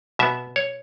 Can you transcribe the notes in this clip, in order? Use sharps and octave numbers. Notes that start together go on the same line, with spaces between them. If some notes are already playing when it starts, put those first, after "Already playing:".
B2 B3 E5
C#5